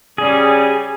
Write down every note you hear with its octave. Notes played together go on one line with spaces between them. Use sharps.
C#3 G3 G#4